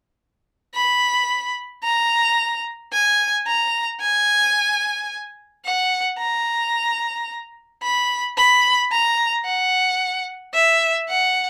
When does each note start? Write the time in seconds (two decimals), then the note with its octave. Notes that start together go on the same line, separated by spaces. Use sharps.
0.75 B5
1.83 A#5
2.93 G#5
3.47 A#5
4.01 G#5
5.65 F#5
6.19 A#5
7.83 B5
8.37 B5
8.91 A#5
9.45 F#5
10.54 E5
11.09 F#5